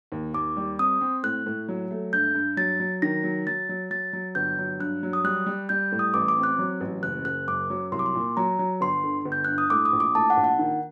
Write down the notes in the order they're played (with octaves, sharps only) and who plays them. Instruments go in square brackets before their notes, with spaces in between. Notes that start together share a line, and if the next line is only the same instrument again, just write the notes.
[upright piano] D#2
[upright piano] D#2 [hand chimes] D6
[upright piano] G3
[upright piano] C4 [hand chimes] D#6
[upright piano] C4
[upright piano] A2 [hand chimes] F#6
[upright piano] A2
F#3
A3
[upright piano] G2 [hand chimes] G6
[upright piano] G2
[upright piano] F#3 [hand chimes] A6
[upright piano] F#3
[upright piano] D#3 [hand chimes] A#6
[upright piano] F#3
[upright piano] F#3 [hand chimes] A6
[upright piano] F#3
[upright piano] F#3 [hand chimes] A6
[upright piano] F#3
[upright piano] G1 [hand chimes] G6
[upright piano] F#3
[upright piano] G2 [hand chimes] F#6
[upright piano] F#3
[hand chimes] D#6
[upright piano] G3 [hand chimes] F#6
[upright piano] G3
[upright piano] G3 [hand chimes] G6
[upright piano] A2
[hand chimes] D#6
[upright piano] A1 [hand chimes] D6
[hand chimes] D6
[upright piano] C4
[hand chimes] F#6
[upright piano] F#3
A1
[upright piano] F#1 [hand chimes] F#6
[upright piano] F#1 [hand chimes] F#6
[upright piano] F#2 [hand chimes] D6
[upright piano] F#3
[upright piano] C2 [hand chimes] C6
[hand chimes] D6
C6
[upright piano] A#2
[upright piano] F#3 [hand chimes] A#5
[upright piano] F#3
[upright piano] G1 [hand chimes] C6
[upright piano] D3
G1
[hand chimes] G6
[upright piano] G2 [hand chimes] F#6
[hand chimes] D#6
[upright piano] A2 [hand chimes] D6
[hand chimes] D#6
[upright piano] A#1
[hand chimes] D6
[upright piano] A2 [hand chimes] A5
[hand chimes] F#5
[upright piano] A#1
[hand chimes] F#5
[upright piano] D#3